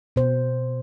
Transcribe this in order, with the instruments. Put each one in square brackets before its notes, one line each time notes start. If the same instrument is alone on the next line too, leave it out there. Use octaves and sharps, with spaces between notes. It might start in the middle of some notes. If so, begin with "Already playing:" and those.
[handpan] B2 C5